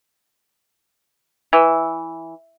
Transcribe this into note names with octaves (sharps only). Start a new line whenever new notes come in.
E3